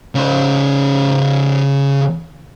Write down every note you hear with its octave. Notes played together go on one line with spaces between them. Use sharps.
C#3 C5